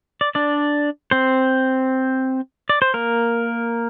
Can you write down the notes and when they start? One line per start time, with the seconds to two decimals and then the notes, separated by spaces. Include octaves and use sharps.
0.21 D5
0.35 D4 D5
1.11 C4 C5
2.69 D5
2.82 C5
2.94 A#3 A#4